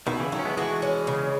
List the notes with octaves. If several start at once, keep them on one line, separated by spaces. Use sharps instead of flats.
B2 D#3 E4
C#3 E3
D#3 F#3 A3
C#4
G#3 B3
E3 G#3 F#4
C#4
C#3